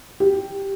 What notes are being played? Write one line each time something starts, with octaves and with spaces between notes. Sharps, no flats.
G4